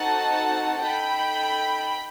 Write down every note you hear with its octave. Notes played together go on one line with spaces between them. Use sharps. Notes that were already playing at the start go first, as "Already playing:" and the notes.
Already playing: C4 D#4 F#4 A4 F#5 A5
D#4 A4 G5 B5